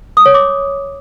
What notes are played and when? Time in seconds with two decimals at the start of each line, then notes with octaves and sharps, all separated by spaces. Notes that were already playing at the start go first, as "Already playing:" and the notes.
0.17 D#6
0.26 C#5
0.34 D6